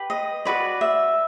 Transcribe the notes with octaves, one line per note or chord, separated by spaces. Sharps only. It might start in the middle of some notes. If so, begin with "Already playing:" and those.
Already playing: G4 B4
D#5
F#4 B4 D5
E5